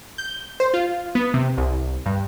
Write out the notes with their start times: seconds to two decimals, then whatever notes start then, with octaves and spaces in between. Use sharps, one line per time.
0.18 G6
0.60 C5
0.74 F4
1.15 B3
1.34 C3
1.57 C2
2.06 G2